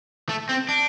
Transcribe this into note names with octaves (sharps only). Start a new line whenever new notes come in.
A3
C4
D4